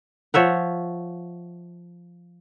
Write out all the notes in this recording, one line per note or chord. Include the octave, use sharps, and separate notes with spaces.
F3 C#5 E5 F#5